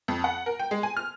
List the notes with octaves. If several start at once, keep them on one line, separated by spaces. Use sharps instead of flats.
F2
F#5
A#4
G5
G#3
G#5
F6